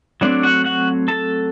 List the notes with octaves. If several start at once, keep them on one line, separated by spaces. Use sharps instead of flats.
F#3 A3 C4 D4 D5
F#4 F#5
F#4 F#5
A4 A5